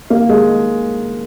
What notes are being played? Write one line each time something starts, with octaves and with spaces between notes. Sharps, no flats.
A#3
G#3